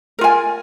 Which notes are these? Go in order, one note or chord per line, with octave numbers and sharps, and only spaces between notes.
F4 A#4 G#5